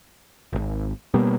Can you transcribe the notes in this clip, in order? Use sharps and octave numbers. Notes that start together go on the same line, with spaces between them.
D#1 G#1
B2 G3 A#3 B3